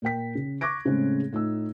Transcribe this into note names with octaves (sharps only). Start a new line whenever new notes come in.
A#2 A#4 G5 B6
C#3
C#6 D6 F#6 G#6 A#6 D7
A2 C#3 G#3 A3 C4 C#4
A2 D#4 F4 E6